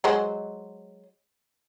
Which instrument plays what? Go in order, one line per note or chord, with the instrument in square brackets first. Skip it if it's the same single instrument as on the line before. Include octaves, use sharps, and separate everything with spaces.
[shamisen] F#3 G#3 C5